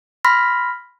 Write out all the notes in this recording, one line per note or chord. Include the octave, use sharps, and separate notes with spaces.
B5 C6 F6 A#6 B6